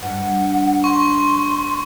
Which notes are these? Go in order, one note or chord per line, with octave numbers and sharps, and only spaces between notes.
G2 F#5
C6 C#6